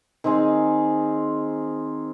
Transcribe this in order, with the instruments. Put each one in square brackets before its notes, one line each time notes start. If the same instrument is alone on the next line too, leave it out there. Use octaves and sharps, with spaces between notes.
[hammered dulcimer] D#3 C4 D#4 G#4